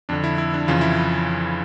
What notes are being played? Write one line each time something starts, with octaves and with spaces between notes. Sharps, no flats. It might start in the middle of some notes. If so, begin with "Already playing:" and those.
F2 D3 D4
E4
E4
D4
F2 C#3 E3 F4
E4